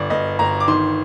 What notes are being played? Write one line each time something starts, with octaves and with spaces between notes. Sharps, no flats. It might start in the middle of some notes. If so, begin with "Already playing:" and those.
Already playing: G1 D5
G1 D#5
G1 A#5
D6
D#3 C6